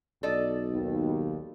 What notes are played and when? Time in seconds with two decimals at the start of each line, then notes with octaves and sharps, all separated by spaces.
0.23 B1 A4 D5 D#5
0.72 D#2